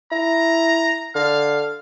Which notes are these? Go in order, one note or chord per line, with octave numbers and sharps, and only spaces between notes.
E4 A#5
D3 F5